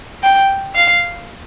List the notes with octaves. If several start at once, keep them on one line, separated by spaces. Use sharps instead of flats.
G5
F5